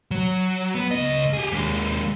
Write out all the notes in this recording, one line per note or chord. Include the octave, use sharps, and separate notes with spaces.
F#3
B3
C#2 D#5
G4 G#4
D#2 G#3